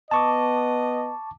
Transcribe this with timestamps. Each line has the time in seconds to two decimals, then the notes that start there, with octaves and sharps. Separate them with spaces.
0.11 B3 D#5 A5 C#6 D6